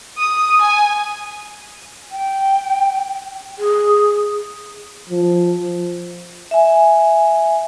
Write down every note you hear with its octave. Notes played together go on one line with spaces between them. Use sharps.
D#6
G#5
G5
G#4
F3
E5 G#5